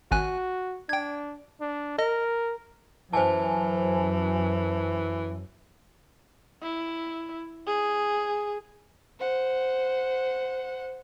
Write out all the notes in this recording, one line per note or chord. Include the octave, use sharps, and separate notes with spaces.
G#1 F#4 G#5 F#6
D4 G5 G#6
D4
A#4 D#5
F#2 E3 C5 G#5 A5
E4
G#4
C5 F#5